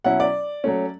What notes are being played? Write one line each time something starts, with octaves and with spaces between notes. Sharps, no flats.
B2 F#3 C#4 E4 F#5
D5
F#3 A3 C#4